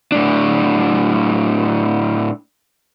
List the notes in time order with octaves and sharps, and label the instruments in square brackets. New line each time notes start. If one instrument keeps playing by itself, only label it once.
[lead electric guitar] A2 D4